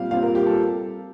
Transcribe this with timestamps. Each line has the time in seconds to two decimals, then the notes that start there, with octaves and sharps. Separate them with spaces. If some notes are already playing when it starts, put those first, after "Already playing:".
Already playing: A#2 G3 C4 F5
0.11 A#2 G3 C4 F5
0.23 A#4
0.35 G4
0.46 A4